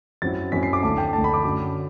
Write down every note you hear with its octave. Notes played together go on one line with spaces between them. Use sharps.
F#2 F#3 C4 E4 A6
F#2 F#3 C4 E4 B6
C7
D6
D2 D3 A3 A5
G5
D2 D3 A3 A5
B5
D6
F#2 D3 F#3